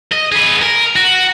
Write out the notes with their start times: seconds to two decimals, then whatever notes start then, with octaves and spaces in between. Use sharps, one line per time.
0.12 D#5
0.32 G#4 B4
0.62 A#4
0.96 F#4